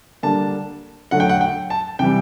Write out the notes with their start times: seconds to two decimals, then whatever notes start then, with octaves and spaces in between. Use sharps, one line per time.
0.23 D3 G3 A#3 D4 A5
1.11 D3 F#3 A3 F#5
1.20 G5
1.29 F#5
1.41 G5
1.70 A5
1.99 C3 E3 G3 G5